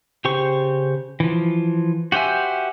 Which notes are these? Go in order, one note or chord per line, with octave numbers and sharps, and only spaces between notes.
C#3 G4 C5 C#6
E3 F3
F#4 G4 C5 E5 G#5